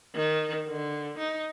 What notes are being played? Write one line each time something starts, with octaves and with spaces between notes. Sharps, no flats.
D#3
D3
D#4